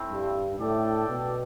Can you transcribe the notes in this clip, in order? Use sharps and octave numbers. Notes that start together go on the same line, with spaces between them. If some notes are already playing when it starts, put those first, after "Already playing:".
Already playing: A3 C4 E4
G2
A2 D4 A4 D5 G5
B2